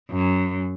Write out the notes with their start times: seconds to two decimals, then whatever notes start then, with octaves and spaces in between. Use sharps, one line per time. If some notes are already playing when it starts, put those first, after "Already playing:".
0.10 F#2